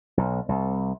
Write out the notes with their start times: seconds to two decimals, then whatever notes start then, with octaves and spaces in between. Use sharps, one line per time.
0.17 B1
0.49 C2